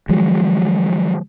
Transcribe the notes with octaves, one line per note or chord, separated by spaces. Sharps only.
D#3 F3 F#3 G#3